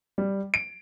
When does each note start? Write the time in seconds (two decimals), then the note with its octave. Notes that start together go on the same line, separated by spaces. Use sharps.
0.18 G3
0.54 D7